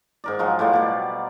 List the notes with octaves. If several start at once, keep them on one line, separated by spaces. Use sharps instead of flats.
G#2 A#4 D5
F3 F#3 G#3 F4
A2 F#3 G3 F4
B2 D5